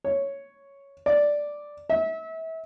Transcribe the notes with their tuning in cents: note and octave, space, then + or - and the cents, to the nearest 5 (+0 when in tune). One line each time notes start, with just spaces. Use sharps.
C#5 +0
D5 +0
E5 -30